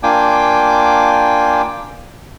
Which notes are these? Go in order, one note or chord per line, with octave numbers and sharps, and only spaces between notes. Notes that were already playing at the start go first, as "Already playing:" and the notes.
A#3 D4 F4 G5 G#5 D6